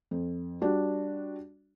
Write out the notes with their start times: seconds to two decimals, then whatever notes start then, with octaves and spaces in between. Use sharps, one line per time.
0.11 F2
0.61 G3 D4 F#4